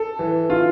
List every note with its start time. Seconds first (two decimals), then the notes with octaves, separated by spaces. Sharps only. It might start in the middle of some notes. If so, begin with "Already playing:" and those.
Already playing: A4
0.19 E3
0.50 F4